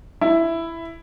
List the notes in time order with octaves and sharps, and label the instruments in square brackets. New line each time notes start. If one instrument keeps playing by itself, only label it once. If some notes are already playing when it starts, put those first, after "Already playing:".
[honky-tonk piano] E4